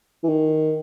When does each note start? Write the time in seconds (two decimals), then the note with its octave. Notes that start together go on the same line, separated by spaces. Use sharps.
0.23 E3
0.29 D#3